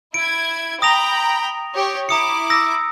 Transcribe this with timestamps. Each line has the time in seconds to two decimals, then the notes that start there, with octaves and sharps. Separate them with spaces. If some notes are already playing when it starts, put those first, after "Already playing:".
0.14 E4 G#6 D7
0.82 G5 A#5 B5 D#6 A#6 F7
1.75 G4 C#5
2.09 E4 A#5 D6 D#6 C#7
2.50 D#6 E6 A#6